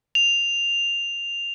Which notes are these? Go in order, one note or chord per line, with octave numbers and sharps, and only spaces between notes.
F7